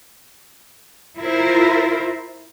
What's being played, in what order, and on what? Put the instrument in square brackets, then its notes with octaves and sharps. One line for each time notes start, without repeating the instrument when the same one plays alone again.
[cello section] E4 F4 A#4 C5